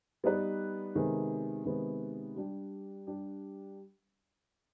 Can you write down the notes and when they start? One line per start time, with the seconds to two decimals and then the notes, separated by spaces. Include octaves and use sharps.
0.24 G3 B3 D#4 B4 D5
0.95 C3 D#3 G#3 B3
1.65 C3 D#3 G#3 B3
2.36 G3 D4 G4
3.07 G3 D4 G4